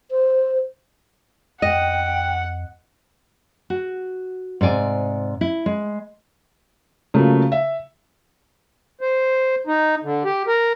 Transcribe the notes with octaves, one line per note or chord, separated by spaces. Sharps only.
C5
F2 D#5 F#5 G5
F#4
G#2 C3 D5 G#5
E4
G#3
C#3 F3 F#3 A3 A#3
E5
C5
D#4
D3
G4
A#4